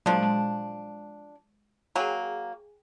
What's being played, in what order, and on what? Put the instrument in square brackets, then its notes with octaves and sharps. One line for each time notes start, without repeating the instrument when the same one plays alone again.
[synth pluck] A#2 F#3 G#3 [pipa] F3 D4
[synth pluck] G#3
[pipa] F#3 A#3 [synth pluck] G#4 G5 G#5